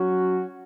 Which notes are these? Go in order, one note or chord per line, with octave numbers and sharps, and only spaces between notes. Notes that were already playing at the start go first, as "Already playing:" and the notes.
Already playing: F#3 C#4 F#4